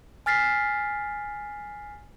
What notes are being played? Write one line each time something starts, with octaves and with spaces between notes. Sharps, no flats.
G#5 F6 A6 B6 C7